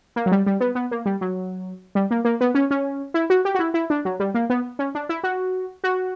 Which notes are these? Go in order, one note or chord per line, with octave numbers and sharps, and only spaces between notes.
A#3
F#3
G3
G3
B3
B3
A#3
G3
F#3
G3
A#3
A#3
B3
C#4
C#4
E4
F#4
G4
F#4
E4
E4
D4
F#3
G3
A#3
B3
C#4
D4
E4
F#4
F#4